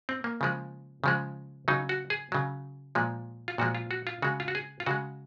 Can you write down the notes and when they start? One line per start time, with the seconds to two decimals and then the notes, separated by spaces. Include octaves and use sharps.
0.09 C4
0.24 A#3
0.41 C#3 F3 G#3
1.04 C#3 F3 G#3
1.68 C#3 F#3 D#4
1.89 F#4
2.10 G#4
2.32 C#3 F#3
2.95 A#2 F3 G#3
3.48 F4
3.58 A#2 F3 G#3 F#4
3.75 F4
3.91 F#4
4.07 F4
4.22 C#3 G#3 F#4
4.40 F4
4.48 F#4
4.55 G#4
4.80 F4
4.86 C#3 G#3 F#4